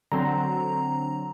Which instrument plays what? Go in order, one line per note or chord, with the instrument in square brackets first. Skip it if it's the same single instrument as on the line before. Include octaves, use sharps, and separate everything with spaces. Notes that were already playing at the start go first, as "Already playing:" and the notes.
[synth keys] D3 F#3 C4 [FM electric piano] A#5